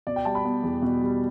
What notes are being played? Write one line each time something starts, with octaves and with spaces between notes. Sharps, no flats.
B2 D5
G5
G3 A5
B5
B3
E2
B2
G3